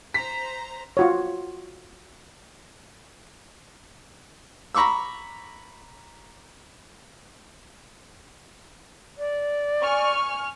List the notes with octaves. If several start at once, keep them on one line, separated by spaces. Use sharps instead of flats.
C5 A#5 B6
F4 F#4 C#5
A#5 B5 C#6 D6 E6
D5
G#5 C#6 F6